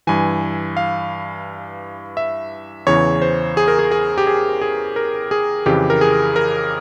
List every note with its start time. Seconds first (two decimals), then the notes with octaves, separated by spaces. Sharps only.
0.07 G2 E3 G#5
0.77 F5
2.17 E5
2.86 E2 C#3 E3 C#5
3.22 C5
3.57 G#4
3.68 A#4
3.79 G#4
3.91 G#4
4.18 G4
4.27 G#4
4.61 G#4
4.96 A#4
5.31 G#4
5.66 F2 C#3 E3 G4
5.90 A#4
6.01 G#4
6.36 A#4